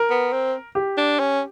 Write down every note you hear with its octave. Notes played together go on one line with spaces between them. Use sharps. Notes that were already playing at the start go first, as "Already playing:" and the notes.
Already playing: A#4
B3
C4
G4
D4
C#4